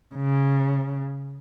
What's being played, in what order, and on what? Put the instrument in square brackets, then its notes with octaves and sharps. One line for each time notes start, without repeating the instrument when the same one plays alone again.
[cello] C#3